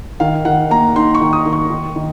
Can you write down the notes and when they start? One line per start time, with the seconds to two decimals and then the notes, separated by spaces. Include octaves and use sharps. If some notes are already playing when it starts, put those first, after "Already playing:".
0.20 D#3 F5
0.45 D#3 F#5
0.70 A#3 A#5
0.96 D#4 C6
1.15 C#6
1.21 D#3
1.33 D#6
1.46 D#3
1.53 C#6
1.71 D#3
1.96 D#3